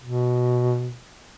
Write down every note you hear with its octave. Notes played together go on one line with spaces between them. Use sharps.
B2